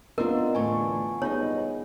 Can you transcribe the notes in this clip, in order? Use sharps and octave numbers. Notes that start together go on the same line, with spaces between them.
B3 C4 D4 F4 A#4 C5 D#5 A#5
E2 A2 D3 G#5 C#6
G3 B3 D#4 E4 G#4 C#5 D#5